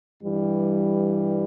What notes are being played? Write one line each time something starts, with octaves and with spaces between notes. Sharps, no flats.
G2 E3 G3